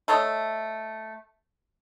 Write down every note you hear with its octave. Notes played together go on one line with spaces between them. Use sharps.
A3 A4 C#5 D#5